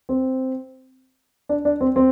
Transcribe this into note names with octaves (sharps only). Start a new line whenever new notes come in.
C4
D4
D4
C4
C4